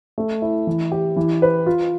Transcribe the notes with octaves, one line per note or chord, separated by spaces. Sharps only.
A3
E4
E3
G4
E3
B4
F4